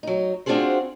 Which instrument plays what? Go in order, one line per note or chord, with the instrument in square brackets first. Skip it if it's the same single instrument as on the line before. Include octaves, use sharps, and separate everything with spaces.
[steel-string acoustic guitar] F#3 D#4
C4 D4 F4 F#4 G#4 C5